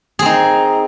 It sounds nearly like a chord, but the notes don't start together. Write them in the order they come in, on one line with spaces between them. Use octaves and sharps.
G#4 C4 D#4